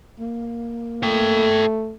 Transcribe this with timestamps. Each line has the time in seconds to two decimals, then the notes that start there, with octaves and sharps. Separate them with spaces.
0.20 A#3
1.03 A3 A4 G5